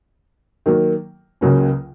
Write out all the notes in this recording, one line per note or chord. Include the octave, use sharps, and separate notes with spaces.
D#3 F#3 A#3
C#2 C#3 F#3 A#3 C#4